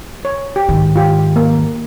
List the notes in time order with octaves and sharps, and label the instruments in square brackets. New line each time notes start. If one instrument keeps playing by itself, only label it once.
[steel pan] C#5
G4
[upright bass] G#2 D#3
[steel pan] F4 G4
A#3